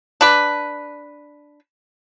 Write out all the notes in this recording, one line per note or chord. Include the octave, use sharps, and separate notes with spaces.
D4 B4